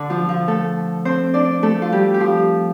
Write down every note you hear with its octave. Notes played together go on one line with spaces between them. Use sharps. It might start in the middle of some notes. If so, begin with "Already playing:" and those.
Already playing: D3 D4
F3 F4
F3 F4
A3 A4
C4 C5
D4 D5
A3 A4
F4
G3 G4
G4
F3 F4